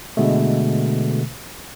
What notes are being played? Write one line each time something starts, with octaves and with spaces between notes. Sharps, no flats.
B2 D3 G#3 A3